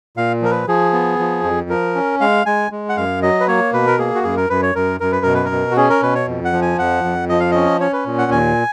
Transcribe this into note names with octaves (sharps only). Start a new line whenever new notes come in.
A#2 F5
F3 A#4
B4
F3 G#4
B3
F3
F2
F3 A#4
C#4
G#3 F5
G#3 G#5
G#3
F#5
F#2 F5
F#3 D#5
B4
A#3 C#5
B2 B4
A#4
A#3 G#4
F#4
F#2 G#4
A#4
F#2 B4
C#5
F#2 A#4
F#2 A#4
B4
B2 A#4
B4
A#4
B2
F#4
C#4 G#4
A#4
B2 B4
C#5
F2
F#5
F3
G#5
F2 F#5
F2
F3 D#5
F5
C#4 D#5
C#4 C#5
B4
A#2
F#5
D#2 G#5